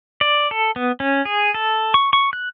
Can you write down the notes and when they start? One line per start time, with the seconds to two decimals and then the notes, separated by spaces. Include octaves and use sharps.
0.21 D5
0.51 A4
0.76 B3
1.00 C#4
1.25 G#4
1.54 A4
1.94 C#6
2.13 C#6
2.33 F#6